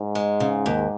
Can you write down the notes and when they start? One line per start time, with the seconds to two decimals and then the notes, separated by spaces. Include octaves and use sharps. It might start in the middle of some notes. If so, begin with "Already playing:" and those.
Already playing: G#2
0.15 G#3
0.40 C#3
0.66 D#2